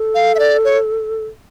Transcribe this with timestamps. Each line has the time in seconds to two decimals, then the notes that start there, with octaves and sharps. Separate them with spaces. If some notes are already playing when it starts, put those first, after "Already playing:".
Already playing: A4
0.15 F5
0.35 E5
0.39 D5
0.65 C#5